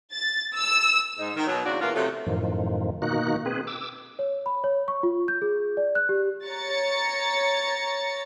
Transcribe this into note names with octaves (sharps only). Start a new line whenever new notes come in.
A6
E6
G#2 D#4
D#3
B2 F#3
E2 G#2 C#3 D4 F#4
E2 A#2 E3 A#3 F4 F#5
C3 F3 F#3 A3
F#2 A2 D#3 F3
B2 D#3 A#3 D#4 F#4 F#6
C4 G#4 B4
D6 E6
C#5
B5
C#5
C#6
F4
G6
G#4
D5
F#6
G4
C#5 A#5 A6 C#7